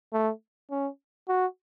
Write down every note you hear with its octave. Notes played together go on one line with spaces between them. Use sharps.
A3
C#4
F#4